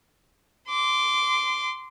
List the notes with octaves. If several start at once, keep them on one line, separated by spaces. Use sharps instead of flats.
C6 D6